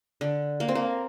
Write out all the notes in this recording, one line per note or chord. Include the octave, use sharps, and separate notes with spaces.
D3
A#3
C4
A#3